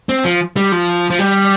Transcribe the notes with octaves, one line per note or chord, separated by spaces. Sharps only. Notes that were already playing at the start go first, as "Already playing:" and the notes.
C4
F3
G3
F3
F3
G3